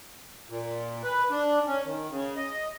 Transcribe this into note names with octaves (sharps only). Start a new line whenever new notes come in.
A#2
B4
D4
C#4
D#3
C#3
D#5